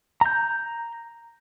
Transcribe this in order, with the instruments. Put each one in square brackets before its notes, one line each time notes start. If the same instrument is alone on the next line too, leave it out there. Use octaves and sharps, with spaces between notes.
[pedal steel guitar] A#5 G6